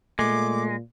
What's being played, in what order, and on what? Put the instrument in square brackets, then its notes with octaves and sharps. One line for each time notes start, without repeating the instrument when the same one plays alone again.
[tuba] A#2 [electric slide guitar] G#3 [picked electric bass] A3 [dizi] D6